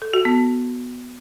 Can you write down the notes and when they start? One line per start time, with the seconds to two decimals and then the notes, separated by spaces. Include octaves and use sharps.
0.02 A4
0.13 F#4
0.25 B3